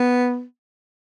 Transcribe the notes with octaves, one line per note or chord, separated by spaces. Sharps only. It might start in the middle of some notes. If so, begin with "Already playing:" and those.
Already playing: B3